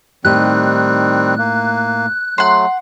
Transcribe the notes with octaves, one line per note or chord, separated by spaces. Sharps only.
A2 D#3 G3 C4 D#4 G4 F#6
A#3
F#3 A3 F#5 C6